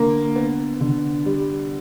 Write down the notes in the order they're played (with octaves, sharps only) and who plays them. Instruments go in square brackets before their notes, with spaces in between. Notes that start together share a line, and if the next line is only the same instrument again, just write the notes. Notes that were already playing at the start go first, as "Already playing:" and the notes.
Already playing: [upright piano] D3 [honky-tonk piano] A#3
[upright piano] B3
D3
G3